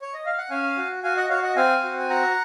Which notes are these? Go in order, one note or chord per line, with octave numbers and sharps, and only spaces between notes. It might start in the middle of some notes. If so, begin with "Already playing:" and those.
C#5
D#5
F5
F#5
C#4 F5 G#5
F#4
F#4 F5 G#5
D#5 F#5
F#4 C#5 F5
D#5 F#5
C4 F5 G#5
F#4
G#5
F#4 F#5 A#5